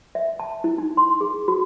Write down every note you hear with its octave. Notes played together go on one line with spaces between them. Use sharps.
E5
A5
E4
D#4
C6
G#4
F#4